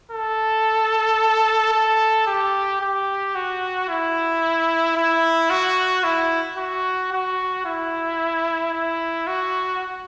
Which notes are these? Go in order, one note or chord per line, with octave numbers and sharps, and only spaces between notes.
A4
A4
G4
G4
F#4
E4
E4
F#4
E4
F#4
F#4
E4
E4
F#4